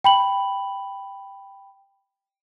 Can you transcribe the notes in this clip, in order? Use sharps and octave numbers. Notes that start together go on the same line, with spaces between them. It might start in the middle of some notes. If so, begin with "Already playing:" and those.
G5 B5 F#7